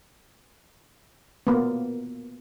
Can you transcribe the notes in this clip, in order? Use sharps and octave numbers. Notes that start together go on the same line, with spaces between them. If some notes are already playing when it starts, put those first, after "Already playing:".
A#3 B3